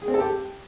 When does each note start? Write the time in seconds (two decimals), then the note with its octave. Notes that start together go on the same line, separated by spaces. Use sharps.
0.02 G#4
0.08 C4
0.14 A4
0.20 G4